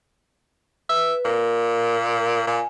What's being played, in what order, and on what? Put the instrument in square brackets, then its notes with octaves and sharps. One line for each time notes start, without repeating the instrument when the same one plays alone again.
[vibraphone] B4 [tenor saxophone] E5
[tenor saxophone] A#2 [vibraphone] A#4
[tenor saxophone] A#2 [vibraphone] G#5